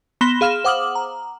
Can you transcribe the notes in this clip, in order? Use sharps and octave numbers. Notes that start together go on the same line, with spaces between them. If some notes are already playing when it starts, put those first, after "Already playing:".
B3 B5 C6 A#6 E7 G7
G#4 F5 F6 E7
C5 F#5 D6 D#6 F6 F#7
A#5